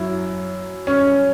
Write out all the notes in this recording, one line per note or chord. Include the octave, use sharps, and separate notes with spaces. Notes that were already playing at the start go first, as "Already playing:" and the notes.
Already playing: F#2 F#3 E4
C#4